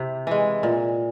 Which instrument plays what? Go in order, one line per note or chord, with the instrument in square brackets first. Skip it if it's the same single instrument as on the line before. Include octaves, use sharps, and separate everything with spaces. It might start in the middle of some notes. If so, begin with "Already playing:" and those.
Already playing: [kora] C3 E4 G4
E3 G#3
A#2